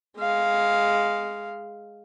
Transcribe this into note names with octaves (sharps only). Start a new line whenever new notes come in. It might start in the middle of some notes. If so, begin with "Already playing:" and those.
G#3 F5